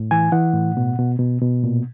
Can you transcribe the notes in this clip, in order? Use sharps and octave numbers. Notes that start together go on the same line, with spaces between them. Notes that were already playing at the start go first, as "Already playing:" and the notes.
Already playing: A2
E3 G#5
E3 F#5
A2
B2
B2
B2
B2
A#2